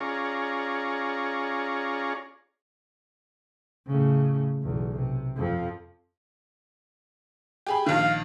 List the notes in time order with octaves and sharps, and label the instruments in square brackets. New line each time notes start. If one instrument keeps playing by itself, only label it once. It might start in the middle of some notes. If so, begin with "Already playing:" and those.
[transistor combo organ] C#4 F4 G#4 C#5 D5 A#5
[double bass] A2 C#3
B1 E2
C3
F2 F3
[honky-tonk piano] G4 G#4 B5
[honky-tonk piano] A#1 D#3 [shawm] F5